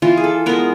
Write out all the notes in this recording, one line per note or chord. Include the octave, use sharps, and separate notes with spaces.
E3 F4
G#4
A4
G#3 B3 A#4